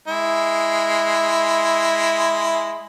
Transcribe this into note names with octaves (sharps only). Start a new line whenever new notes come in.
G#3 E4